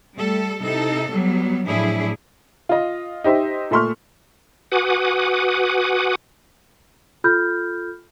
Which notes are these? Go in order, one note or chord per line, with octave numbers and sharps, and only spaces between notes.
G3 A3 A4
C3 D#4 E4 A4
F#3 G3 B3
A2 F3 F#3 D4 E4 G#4
F4 D#5
D#4 G4 C5 E5
A#2 A3 E5 C6 C#6 F6
F#4 B4 F#5 G#5 D6 D#6
F4 A4 B5 F6 G6